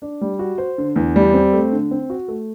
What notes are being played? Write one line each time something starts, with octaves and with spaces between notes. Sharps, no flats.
D4
G3
F#4
C5
D3
E2
G3
C4
A3
D3
C4
F#4
A3